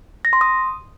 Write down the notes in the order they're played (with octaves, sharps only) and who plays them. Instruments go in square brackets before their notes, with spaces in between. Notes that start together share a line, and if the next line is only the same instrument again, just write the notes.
[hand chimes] A#6
C6
D#6